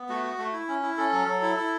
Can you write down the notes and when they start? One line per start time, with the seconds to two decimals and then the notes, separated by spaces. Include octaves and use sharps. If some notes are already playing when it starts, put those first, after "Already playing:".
Already playing: B3
0.09 A3 F#4
0.23 F#4
0.38 A3
0.53 E4
0.68 C#4
0.83 E4
0.98 C#4 A4
1.13 F#3
1.27 F#3
1.42 E4
1.57 E4